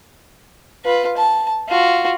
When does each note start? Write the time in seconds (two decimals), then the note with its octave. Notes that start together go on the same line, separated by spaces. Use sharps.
0.85 F4 B4
1.17 A5
1.68 F4 F#4